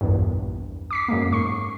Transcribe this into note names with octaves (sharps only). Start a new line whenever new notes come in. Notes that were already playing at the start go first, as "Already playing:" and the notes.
A#1 E2 G2
D6 B6 C7
F#2 G#3 A#3
G#2 C#6 C7